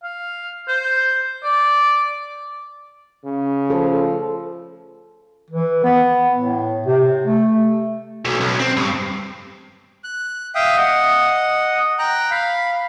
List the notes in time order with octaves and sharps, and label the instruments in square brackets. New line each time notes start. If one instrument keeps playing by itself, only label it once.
[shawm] F5
C5
D5
[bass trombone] C#3
[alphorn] F3 [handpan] A4
[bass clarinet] E3
B3
A2
C3
A3
[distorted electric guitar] B1
B1
C4
G2
[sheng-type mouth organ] F#6
E5 F5 G5 D#6
D#5 F#5
G5 A#5 F#6
F5 B5